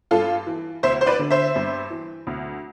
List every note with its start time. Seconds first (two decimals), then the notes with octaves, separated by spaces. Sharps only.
0.11 G2 F4 A4
0.47 E3
0.83 D2 C5 E5
1.01 C5
1.06 B4 D5
1.19 D3
1.30 C5 E5
1.56 G2
1.90 E3
2.27 D2